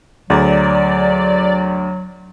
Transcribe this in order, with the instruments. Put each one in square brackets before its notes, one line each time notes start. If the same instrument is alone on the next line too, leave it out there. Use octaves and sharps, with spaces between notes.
[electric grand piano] D2 G#4 A#5 [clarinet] F#3 [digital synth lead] D5